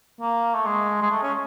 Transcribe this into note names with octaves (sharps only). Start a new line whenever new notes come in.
A#3
A3
G#3
G#3
A3
C#4